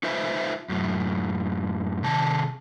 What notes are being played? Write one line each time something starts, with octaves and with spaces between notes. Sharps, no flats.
D#4 F4 B4 C5 E5
F#2 A2
C3 D#3 A5